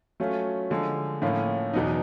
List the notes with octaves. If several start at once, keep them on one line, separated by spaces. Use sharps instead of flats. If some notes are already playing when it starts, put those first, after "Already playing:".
F#3 A3 C#4 F4
D3 F3 G#3
A2 F3 A#3 C#4 F4
E2 B2 F#3 B3 D#4